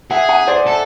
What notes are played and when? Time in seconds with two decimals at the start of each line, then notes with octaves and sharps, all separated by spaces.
0.11 G#4 E5 F#5
0.29 F#5 G#5
0.48 C5 D5
0.67 A4